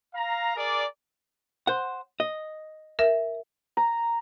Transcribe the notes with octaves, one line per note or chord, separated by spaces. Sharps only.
F5 A#5
G#4 A#4 D5
C5 F#5
D#5
A#4 E5
A#5